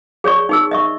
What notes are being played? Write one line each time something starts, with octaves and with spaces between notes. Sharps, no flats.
G#4 C#5 D5 C#6
D#4 G#4 E6
D#5 E5 C#6